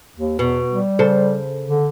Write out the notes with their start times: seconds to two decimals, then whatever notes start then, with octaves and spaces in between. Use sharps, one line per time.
0.17 D#2
0.39 E2 B2
0.70 G3
0.99 C#3 A4 C5
1.66 D3